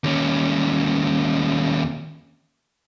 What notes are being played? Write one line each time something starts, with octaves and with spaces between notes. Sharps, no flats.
D#2 C#4